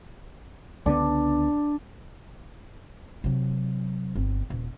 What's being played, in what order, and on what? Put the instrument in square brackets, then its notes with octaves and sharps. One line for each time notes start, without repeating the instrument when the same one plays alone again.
[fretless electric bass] C#2 D3 B3 [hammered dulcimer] D4
[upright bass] C3 F#3
G1 C4
D#1